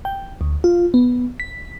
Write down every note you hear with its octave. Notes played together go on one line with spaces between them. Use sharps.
G5
D2
F4
B3
B6